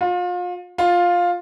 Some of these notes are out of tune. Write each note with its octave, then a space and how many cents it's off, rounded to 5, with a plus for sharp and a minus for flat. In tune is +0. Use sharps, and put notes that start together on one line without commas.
F4 +35
F4 +10